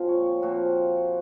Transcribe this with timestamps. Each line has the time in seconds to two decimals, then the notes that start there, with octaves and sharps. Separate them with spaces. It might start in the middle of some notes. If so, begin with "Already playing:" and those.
Already playing: A#2 F3 C4
0.09 C#5
0.26 C#5
0.42 A#2 F3 C4 F#4